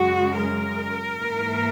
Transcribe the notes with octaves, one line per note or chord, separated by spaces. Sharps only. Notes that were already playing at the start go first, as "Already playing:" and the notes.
Already playing: F#2 C#3 G#3 F#4
A#4
G#2 E3 A#3